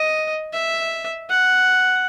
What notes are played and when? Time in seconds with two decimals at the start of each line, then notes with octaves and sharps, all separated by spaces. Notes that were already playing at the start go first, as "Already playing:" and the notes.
Already playing: D#5
0.53 E5
1.29 F#5